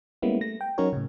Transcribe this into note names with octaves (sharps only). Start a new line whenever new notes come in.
G3 G#3 A#3 B3 C#4 E4
A3 A#6
G5
F#3 C#4 D#4 F#4 A#4 C#5
A2 C#3